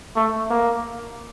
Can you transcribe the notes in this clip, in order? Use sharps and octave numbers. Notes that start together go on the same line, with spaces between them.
A3
A#3